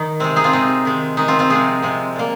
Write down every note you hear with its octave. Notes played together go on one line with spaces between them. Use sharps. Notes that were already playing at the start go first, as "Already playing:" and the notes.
Already playing: D#3 D#4
C3 G#3 C4
D#4 G#4
C4 F4
C3 G#3 D#4
D#3 G#3
D#3 G#3 D#4
C4 F4
C4 F4
C3 F3 G#3 D#4 G#4
C3 F3 G#3
A#2 A#3